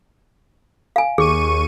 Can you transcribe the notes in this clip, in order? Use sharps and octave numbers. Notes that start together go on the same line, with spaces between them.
F5 G#5
D#2 G#4 C#6 D#7